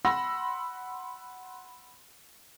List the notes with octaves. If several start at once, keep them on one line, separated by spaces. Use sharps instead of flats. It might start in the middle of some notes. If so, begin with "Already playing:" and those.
F#5 B5 C6 E6 A#6